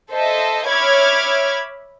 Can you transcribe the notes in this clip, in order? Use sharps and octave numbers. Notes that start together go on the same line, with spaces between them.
A4 C5 D#5 E5
C#5 E5 B5 D6 F6 G#6